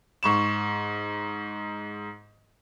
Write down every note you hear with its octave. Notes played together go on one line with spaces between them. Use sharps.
G#2 C#6 E7